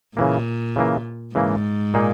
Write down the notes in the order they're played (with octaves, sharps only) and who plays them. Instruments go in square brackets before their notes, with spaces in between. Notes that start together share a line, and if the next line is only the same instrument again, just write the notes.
[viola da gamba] A#2 [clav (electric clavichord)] C#3 E3 A#3
[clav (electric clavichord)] C#3 E3 A#3
[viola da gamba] G#2 [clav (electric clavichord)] C#3 E3 A#3
[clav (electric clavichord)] A#2 A#3 D#4 G#4